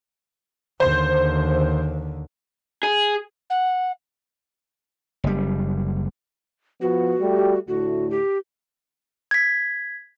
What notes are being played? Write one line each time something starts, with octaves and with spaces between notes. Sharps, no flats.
D#2 D3 C5
G#4
F#5
F#1 G3
F3 B3 F#4
G3 A3 G4
D2 A2 A3 F#4
G4
G#6 B6